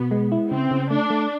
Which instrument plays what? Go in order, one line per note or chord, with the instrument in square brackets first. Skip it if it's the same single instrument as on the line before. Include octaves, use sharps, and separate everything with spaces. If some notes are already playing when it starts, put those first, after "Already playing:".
Already playing: [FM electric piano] B2 [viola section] B3
[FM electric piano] G#3
E4
[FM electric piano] C#3 [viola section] C4
[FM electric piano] C#3
[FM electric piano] A3 [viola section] D4
[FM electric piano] A3